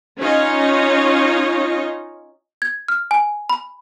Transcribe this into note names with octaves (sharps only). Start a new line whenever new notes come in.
C#4 D#4 F4 C#5 D#5
G#6
F6
G#5
B5